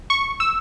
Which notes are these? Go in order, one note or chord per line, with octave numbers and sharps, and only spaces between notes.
C#6
E6